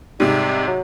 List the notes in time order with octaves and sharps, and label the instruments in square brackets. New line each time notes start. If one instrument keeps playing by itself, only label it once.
[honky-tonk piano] G#2 C3 [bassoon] G3
[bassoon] F#3